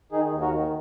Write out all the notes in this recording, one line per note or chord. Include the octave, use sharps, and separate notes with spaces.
D#3 D#4 G#4
D#2
F#4 A#4
D#3